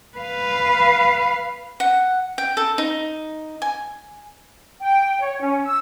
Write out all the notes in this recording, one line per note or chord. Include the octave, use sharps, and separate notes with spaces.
B4 F5
F#5
G5
A4
D#4
G#5
G5
C#5
C#4
E6